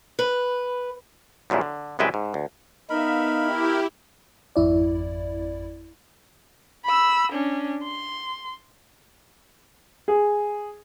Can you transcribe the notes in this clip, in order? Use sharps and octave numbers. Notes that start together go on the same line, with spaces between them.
B4
C2 F#2 A#2 C#3 E4
D3
C2 F#2 G#3 B4 E5 G5
G#2
D2
B3 D#4 A#4 E5 F5 B5
E4 G4
G#1 F2 E4 D5
B5 E6
C#4 D4
C6
G#4